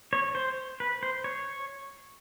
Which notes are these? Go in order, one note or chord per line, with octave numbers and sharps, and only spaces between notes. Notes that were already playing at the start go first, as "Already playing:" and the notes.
C#5
C5
B4
C5
C#5